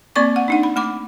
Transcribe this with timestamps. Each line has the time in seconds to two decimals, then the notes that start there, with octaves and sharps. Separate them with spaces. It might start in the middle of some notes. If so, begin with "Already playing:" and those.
0.15 A#3 C4 D5 C#6 D6
0.36 F#5
0.48 D4 D#4 F#5
0.63 B5
0.76 A3 B5 D6